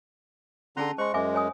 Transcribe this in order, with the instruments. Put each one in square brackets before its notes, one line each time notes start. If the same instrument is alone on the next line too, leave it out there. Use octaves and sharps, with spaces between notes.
[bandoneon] D3 A#5 C6 [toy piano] C#4 G#4 A5
[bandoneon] G#3 C#6 [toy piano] C5 C6
[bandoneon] F#2 G#3 [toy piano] E5 G#5 D6
[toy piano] C#5 G#5 D#6